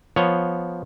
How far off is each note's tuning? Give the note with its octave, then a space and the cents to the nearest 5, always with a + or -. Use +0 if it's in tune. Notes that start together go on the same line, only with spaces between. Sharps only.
F3 +0 B3 +0 C#5 +0